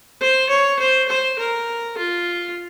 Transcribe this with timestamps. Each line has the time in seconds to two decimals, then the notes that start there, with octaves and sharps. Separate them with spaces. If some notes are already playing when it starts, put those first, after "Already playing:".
0.21 C5
0.50 C#5
0.79 C5
1.09 C5
1.39 A#4
1.98 F4